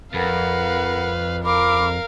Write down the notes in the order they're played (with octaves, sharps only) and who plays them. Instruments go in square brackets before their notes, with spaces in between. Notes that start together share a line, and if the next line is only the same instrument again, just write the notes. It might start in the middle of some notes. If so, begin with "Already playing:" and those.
[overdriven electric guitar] F2 [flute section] A#4 F#5 B5 [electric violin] B4 F5
[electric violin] A#4 F5 [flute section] B5 D6